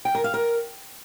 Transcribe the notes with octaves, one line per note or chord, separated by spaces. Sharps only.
G5
A#4
F5
A#4